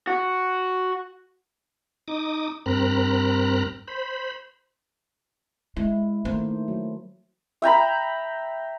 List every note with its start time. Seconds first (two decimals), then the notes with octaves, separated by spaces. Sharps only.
0.07 F#4
2.08 D#4 D6 D#6
2.66 G2 C4 A#4 A#5 B5 F#6
3.88 C5 B5
5.76 G#3 E4
6.25 D#3 A3 A#3 C5
6.68 F#3
7.62 E5 G5 A#5 B5